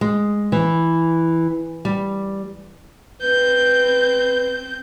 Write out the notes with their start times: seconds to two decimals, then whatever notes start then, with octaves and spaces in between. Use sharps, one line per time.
0.01 G#3
0.52 E3
1.85 G3
3.22 C4 B4 G6